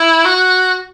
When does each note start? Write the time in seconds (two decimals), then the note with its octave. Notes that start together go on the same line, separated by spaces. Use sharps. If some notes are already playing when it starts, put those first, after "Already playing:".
Already playing: E4
0.25 F#4